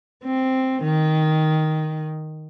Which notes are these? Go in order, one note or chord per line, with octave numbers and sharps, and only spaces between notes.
C4
D#3